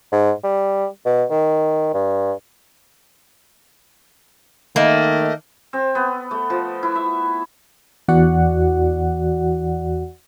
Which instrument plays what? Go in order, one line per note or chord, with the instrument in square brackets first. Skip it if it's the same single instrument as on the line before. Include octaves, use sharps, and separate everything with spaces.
[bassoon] G#2
G3
B2
D#3
G2
[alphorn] D#3 [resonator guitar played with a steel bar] A3 A#3 [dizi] D#5
[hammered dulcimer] C4
B3
A3
F3
E4
E5
[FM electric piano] E2 E3 F#4 D5 F#5